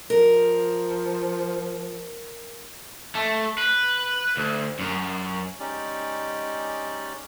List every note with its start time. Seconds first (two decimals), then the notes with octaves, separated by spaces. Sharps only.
0.10 F3 A#4
3.15 A3
3.58 B4
4.37 D2
4.79 F#2
5.60 G#3 C#4 D#4 G4 D5